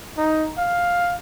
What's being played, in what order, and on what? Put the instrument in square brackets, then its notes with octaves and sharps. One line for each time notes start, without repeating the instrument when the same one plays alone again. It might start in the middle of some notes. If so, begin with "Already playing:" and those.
[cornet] D#4
F5